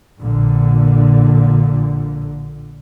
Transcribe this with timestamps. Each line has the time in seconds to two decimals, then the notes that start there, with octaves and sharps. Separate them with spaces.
0.19 A#1 A#2 D3